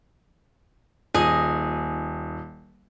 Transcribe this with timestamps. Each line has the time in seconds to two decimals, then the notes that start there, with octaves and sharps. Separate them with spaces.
1.14 D#1 G#4 D#5